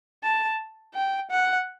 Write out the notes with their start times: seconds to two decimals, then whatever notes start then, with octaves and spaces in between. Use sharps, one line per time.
0.23 A5
0.94 G5
1.30 F#5